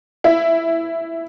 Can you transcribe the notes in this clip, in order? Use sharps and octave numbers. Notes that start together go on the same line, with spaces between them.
E4